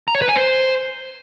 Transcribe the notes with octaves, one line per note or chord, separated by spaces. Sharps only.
A#5
C#5
B4
G#5
C5